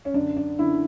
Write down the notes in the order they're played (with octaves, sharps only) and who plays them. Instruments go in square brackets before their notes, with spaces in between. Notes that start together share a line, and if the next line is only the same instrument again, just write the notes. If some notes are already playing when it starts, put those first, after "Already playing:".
[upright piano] C#4
F#2 D3 D4
D4
F#2 D3 E4